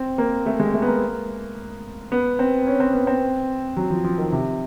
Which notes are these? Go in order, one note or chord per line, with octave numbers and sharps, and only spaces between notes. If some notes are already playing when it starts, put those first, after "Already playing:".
Already playing: C4
A#3
A3
G#3
A3
B3
A#3
B3
C4
C#4
C4
B3
C4
F#3
F3
F3
D#3
C3